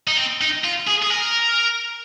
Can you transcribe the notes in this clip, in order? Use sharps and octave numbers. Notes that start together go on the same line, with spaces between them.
D#4
C4
D#4
F4
G#4
G#4
A#4